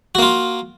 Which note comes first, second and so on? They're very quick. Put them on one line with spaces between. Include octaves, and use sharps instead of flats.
F#4 A#3 F4